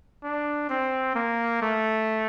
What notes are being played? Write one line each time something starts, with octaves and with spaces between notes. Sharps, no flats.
D4
C4
A#3
A3